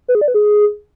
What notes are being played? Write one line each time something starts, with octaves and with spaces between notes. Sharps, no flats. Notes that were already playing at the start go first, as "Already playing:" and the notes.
B4
G#4
D5
B4
G#4